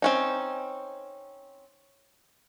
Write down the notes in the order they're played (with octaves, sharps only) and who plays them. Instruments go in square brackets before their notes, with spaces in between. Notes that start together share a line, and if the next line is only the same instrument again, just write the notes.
[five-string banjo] C4 C#4 D#4